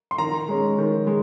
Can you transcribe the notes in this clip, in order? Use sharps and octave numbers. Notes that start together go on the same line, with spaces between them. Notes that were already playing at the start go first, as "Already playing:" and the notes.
C6
D#3 A#5
G#3 C#4
D#3
G#3